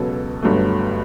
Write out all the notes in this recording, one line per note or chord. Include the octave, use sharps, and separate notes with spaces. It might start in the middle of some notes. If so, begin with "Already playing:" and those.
Already playing: C#2 B2 F#3 B3 A4
G1 G2 F#3 A3